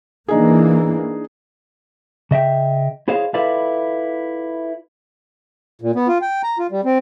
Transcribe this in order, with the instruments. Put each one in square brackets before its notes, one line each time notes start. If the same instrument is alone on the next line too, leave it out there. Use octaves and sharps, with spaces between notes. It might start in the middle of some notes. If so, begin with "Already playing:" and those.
[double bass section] E3 A#3 [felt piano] D4 D#4 G#4
[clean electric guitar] C#3 D#5 E5 G5
E4 G#4 C5 C#5 D#5 F5
E4 F4 A4 B4 D5 F5
[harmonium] A#2
B3
F4
G5
A#5
F4
G3
C4